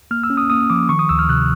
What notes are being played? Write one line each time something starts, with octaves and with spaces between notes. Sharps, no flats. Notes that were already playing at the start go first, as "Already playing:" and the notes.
A#3 F6
E6
C#4
D#6
A#3 D#6
F3 D6
D#3 C#6
D#6
D2 E6
F6
C3 F#6